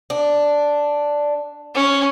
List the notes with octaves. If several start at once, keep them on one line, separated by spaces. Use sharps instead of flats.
D4
C#4